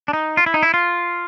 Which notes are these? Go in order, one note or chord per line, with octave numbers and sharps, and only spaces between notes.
D4
D#4
F4
E4
D#4
E4
F4